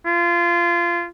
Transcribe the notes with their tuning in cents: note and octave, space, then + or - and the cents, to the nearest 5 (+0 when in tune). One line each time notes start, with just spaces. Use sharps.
F4 -20